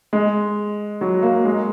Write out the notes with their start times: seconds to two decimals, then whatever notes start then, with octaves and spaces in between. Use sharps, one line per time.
0.13 G#3
1.01 F#3
1.23 A#3
1.45 G#3